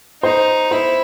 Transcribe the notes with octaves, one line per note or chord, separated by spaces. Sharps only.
D#4 C5
E4 C5